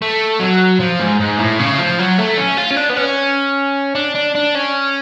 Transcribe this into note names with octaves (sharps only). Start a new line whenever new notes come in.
A3
F#3
F3
G#2
G#2
A2
C#3
F3
F#3
A3
C#4
F4
C#4
D4
B3
C#4
D4
D4
D4
C#4